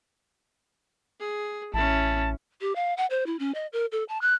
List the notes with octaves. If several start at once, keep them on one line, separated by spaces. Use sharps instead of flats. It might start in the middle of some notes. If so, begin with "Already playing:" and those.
G#4
A1 C#4 E4 A5
G4
F5
F#5
C5
E4
C#4
D#5
A#4
A4
A5
F#6